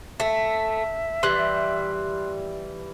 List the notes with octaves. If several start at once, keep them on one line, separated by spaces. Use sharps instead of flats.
A3 E5
E3 G3 C6 F#6